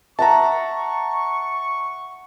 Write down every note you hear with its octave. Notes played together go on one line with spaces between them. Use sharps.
E5 F#5 A5 A#5 C#6 E6